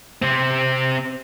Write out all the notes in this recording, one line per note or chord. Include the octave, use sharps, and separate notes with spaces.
C3 C4